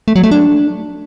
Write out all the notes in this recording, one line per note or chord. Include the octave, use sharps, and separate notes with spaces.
A3
F#3
A3
D4